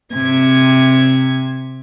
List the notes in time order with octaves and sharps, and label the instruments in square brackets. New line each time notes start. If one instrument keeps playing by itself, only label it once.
[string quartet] C3 G#6